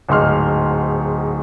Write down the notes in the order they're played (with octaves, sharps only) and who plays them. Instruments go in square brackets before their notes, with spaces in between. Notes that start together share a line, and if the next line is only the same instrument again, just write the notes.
[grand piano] D1 G#2 D#4 C6 F6